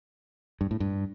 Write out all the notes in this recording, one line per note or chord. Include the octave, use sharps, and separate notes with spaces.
G2
A2
G2